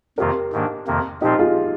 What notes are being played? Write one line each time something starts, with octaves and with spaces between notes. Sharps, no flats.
F2 C3 D#3 A#3 F4 G4 A#4
G#2 D#3 A#3 D4
F2 C3 D#3 A#3
A#2 F3 C4 D#4 F4 G4
F4 G#4